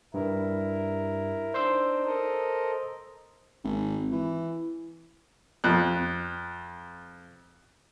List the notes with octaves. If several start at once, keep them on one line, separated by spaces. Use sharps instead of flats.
G2 E4 A#4
D4 D#4 C5 C6 E6
A4 A#4 D#5
G#1
E3
F2 F#6